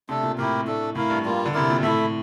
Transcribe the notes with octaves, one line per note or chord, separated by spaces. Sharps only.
C3 A3 D4 A4
A#2
A2 E4 G4 A#4
A3 D4 A4
A2 E4 A#4 F5
G2
G3 A#3 F4
D3
C3 E4 A#4 D5
A#2
A2 A3 E4 A4 E5